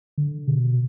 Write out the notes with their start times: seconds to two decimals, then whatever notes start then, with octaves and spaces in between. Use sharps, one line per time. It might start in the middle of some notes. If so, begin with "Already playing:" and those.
0.18 D3
0.47 B2